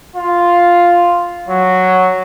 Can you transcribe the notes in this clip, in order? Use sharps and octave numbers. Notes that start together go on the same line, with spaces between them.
F4
F#3